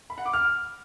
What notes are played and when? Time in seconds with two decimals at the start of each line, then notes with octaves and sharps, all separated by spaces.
0.10 B5
0.18 F#5
0.26 D6
0.33 F6